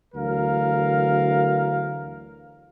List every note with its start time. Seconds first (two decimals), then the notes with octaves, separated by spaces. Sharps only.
0.15 D2 E3 F#3 A#4 F5